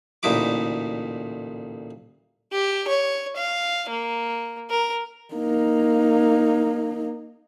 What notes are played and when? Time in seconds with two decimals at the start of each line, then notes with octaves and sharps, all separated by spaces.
0.23 A1 D2 A#2 D#4 E4 D6
2.52 G4
2.88 C#5
3.36 F5
3.89 A#3
4.70 A#4
5.34 A#3 D#4